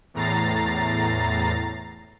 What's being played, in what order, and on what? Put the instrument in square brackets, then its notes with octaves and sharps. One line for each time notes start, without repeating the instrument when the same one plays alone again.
[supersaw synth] E2 A2 A#5 A6 C7